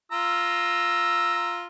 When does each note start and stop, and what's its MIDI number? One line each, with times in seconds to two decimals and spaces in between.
0.12 1.67 65
0.12 1.67 82
0.12 1.67 88